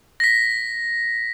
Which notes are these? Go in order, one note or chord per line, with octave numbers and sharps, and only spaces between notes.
A#6 B6